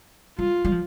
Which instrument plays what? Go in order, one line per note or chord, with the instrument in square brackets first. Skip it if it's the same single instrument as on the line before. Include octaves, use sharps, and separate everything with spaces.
[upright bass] G3 [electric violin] F4
[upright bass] G3
F3